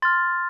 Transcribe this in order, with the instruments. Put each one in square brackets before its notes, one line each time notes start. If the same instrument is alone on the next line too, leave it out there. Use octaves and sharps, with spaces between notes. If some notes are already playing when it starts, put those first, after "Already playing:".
[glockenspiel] C6 F6 A6